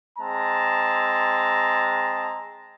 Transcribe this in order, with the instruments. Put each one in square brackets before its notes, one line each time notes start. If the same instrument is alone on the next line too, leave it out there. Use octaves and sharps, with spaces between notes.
[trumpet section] G#3 C4 A5 A#5